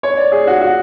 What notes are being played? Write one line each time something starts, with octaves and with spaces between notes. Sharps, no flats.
C#5
D5
G#4
F#4
F#4